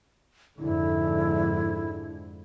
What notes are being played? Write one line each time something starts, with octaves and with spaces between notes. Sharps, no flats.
F2 G#2 D3 E4